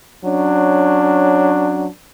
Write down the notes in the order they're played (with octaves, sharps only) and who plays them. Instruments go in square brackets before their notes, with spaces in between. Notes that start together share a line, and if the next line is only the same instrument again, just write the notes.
[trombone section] F#3 C#4 D4